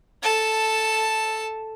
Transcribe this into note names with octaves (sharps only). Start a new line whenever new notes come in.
A4 A5